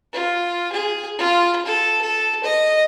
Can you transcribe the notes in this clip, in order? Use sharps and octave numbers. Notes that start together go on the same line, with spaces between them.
F4
G#4
F4
A4
A4
D#5